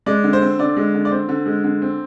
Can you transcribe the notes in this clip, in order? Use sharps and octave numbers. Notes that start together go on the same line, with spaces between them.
G#3 D5
D3
C5
C4
D3 D5
G#3
D3
D5
C4 C5
D3
G#3
D3
C4